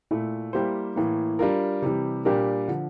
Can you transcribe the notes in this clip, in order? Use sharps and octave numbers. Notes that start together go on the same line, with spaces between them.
A#2 A3 E4
G3 A#3 E4 G4 C5
A2 E3 A#3
G3 D4 F4 A#4
C3 E3 G3
A#2 G3 D4 G4 A#4
D3 F3